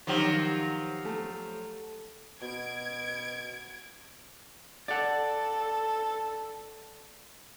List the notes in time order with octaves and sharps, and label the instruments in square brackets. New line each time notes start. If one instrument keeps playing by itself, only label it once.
[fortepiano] D#3 [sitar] F3 F#3 G4
[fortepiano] A3
[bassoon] B2 [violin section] G#6 D7
[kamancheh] A4 [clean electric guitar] D5 F#5